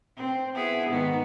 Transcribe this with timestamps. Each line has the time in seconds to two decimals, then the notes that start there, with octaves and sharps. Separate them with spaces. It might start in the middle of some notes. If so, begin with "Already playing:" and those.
0.17 C4
0.55 B3 E4 G#4
0.89 G#2 D#3 B3